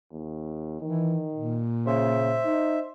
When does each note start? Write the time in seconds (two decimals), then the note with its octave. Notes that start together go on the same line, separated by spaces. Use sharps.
0.12 D#2
0.82 D#3 E3
1.34 A#2
1.87 C#3 C5 E5
2.45 D#4